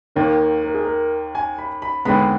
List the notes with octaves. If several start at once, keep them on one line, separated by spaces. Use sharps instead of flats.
D#2 D#3 A#3 A#4
A#4
G#4
A#4
G#5
B5
B5
D#2 D3 G#3 B3 B5